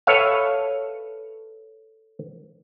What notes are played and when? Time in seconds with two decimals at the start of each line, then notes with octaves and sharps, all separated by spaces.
0.07 A4 B4 C#5 E5 F5